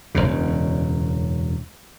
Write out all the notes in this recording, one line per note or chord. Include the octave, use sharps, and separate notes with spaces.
E1 A#1 F#2 C#3